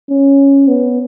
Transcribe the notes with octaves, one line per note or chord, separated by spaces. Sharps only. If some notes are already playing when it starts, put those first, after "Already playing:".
C#4
B3